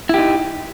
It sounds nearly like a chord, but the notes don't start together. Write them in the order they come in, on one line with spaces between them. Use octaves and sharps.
E4 G4 D#4